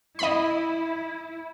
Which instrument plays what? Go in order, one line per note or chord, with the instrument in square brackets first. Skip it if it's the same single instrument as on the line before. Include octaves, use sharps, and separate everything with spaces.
[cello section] E4 [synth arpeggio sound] D#5 B5